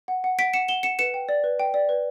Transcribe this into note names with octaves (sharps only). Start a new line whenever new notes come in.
F#5
F#5
F#5 B6 D7
F#5 C#7 E7
F#5 E7 G7
F#5 C#7 E7
B4 C#7 E7
G5
D5
B4
G5
D5
B4